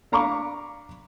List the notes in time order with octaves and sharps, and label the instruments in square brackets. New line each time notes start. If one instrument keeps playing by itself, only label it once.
[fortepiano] D4 F5 A#5 B5 C#6 D6